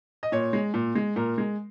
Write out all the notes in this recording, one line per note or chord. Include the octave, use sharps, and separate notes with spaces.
D#5
A#2 C#5
G#3
A#2
G#3
A#2 A#4
G#3